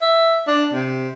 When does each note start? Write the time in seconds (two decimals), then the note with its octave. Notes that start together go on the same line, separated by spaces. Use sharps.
0.02 E5
0.47 D4
0.74 C3